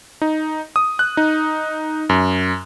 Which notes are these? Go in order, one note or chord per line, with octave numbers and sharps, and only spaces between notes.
D#4
D#6
F#6
D#4
F#2